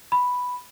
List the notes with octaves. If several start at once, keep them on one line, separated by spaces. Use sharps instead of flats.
B5